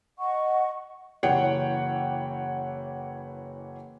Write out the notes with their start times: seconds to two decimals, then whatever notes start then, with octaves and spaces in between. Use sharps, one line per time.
0.18 D#5 F#5 C#6
1.23 F#1 E3 C#5 F#5 G5